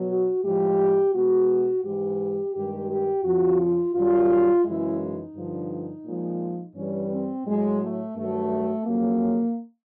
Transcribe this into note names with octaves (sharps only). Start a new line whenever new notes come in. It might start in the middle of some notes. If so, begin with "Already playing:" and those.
Already playing: B2 F#3
F#4
A2 F3 G#3 G4
B2 G#3 F#4
G#2 E3 G#3 G4
G2 D#3 G#3 G4
G4
F2 C#3 F3 F#4
F4
F#2 D#3 G3 F4
F#2 C#3 E3 G#3 E4
D#4
G2 D3 F3
A#2 F3 G#3
G2 E3 G3 C#4
C4
A2 F#3 G#3
A3
G2 D#3 F#3 A3
F2 C#3 F#3 A#3